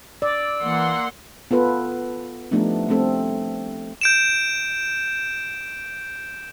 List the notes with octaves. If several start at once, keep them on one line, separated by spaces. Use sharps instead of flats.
D5 E6
E3 A#3 F#5 C6
B3 F4 A4 B4
F3 G3 A3 B3 D4 D#4
G3 A3 C4 A4
G6 D7 E7